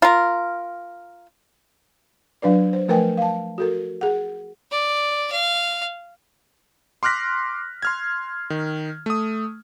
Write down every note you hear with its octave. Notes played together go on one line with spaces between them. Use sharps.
F4 A#4
F#3 D4 B4 D5
C5
F3 A3 A#4 B4 G5 G#5
F5 A5
F#4 A4 A#4
G#4 F#5
D5
F5
C6 D6 F6 F#6 A#6 B6
C6 F6 G#6
D#3
A3 D#6